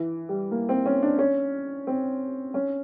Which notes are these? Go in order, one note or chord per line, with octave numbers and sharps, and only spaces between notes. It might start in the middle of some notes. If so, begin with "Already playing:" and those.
Already playing: E3
G3
A#3
C4
C#4
D4
C#4
C4
C#4